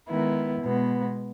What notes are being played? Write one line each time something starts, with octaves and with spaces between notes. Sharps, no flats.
D#3 G#3 B3 E4
B2 G#3 B3